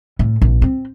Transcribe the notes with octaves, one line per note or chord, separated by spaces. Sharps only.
A2
A#1
C4